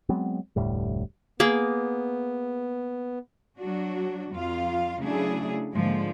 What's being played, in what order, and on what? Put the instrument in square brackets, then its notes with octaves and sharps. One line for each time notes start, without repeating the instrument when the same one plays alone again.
[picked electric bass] F#3 G#3 B3 C4
F1 D2 A2 G3
[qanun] A#3 G#4 [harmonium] B3
[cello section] F#3 D4 F#4
F2 F4 F5
C#3 F#3 A3 D4 E4 G#4
G#2 D3 F3 G#3 A#3